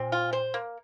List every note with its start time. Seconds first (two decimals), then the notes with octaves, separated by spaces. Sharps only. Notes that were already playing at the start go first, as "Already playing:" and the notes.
Already playing: A#2 C4
0.12 F4
0.33 C5
0.54 A#3